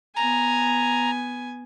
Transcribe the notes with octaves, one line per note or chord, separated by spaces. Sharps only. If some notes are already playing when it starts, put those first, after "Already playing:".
B3 G#5 A#5